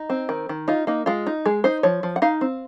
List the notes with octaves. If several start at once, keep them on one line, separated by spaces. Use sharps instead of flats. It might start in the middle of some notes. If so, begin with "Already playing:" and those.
Already playing: D#4
C4
D#3
D#3
D#4 F4
A#3 D#4
G#3 F4
D#4
G#3 G#4
D#4 C5
F3 C#5
F3
F#5
D#4 F5
C4